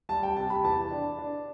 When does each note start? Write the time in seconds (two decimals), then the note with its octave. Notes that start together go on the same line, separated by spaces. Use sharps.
0.09 G3 A5
0.23 G5
0.36 C3 A5
0.50 B5
0.64 E2 A5
0.91 D4
1.19 D4